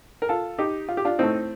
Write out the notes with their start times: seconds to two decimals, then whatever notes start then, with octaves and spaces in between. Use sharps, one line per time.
0.22 A#4
0.29 F4 A4
0.58 D#4 G4
0.89 F4
0.97 G4
1.05 D4 F4
1.18 A2 A3 C4 D#4